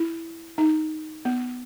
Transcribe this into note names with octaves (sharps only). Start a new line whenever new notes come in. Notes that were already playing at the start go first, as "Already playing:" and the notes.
Already playing: E4
D#4
B3